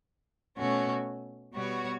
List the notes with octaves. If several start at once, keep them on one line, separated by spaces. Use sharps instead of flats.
B2 A3 C#4 F#4
B2 G3 B3 F#4 C#5